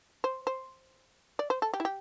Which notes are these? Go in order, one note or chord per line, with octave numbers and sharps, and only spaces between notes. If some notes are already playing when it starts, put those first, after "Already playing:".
C5
C5
D5
C5
A4
G4
E4
G4